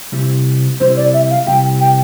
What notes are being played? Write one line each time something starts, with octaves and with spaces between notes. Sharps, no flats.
C3 G3 C4 E4 G4
C3 G3 C4 E4 G4 C5
D5
E5
F5
C3 G3 C4 E4 G4 G5
G5